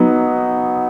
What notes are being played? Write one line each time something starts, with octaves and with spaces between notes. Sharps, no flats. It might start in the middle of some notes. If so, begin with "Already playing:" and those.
Already playing: F#3 B3 D#4